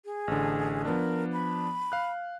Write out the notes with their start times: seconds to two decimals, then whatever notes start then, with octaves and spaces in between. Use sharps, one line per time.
0.05 G#4
0.28 A1 D3
0.85 F3 B3 D4 A#4
1.33 B5
1.92 F5 F#6